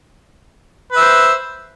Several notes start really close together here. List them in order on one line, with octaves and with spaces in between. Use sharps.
B4 E5 C5